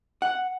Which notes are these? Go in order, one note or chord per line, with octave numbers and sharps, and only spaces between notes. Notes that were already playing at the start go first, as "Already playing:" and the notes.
F#5